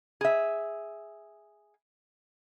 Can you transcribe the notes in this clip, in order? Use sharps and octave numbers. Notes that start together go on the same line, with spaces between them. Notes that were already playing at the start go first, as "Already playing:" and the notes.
G#4 E5